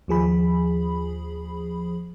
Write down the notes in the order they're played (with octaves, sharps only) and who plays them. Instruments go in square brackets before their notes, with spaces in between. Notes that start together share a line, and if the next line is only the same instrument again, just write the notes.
[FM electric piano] D#2 F3 G#4 B5